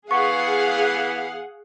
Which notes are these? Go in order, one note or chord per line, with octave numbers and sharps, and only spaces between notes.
E3 B3 G#4 F5 F#5 C#6